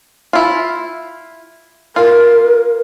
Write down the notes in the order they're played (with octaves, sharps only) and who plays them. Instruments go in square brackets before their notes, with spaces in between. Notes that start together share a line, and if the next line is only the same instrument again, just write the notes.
[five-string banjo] E4 F4
[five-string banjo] F4 [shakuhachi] A#4